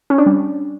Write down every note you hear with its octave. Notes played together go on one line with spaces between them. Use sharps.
C#4
D4
G3